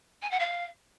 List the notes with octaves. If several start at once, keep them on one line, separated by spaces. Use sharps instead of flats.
G#5
F#5
F5